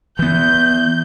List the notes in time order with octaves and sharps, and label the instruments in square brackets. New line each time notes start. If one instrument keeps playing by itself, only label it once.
[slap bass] E3 B3 [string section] G6